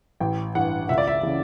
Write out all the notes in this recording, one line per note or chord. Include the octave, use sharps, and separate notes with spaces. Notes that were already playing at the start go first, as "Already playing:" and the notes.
A1 G5
G2 E3 F#5
C#2 E5
D5
E5
C#3 E3